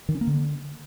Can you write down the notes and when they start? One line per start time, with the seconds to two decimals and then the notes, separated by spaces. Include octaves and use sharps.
0.09 D#3
0.15 C#4
0.21 A#3
0.27 D3